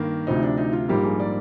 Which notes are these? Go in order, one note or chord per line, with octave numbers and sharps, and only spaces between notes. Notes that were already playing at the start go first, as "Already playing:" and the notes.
Already playing: G2 D#3 A#3
D2 C3 F3 D#4
D4
D#4
F4
A#1 G#2 G3 A#3 G4
G#4
D5